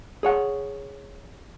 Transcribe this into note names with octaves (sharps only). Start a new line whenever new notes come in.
G#4 C#5 F#5